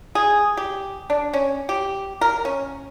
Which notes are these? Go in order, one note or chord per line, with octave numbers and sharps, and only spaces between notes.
G#4
G4
D4
C#4
G4
A#4
C#4